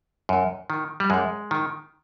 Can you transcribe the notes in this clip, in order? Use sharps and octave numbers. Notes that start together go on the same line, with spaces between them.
F#2
D#3
G3
F#2 G#3
D#3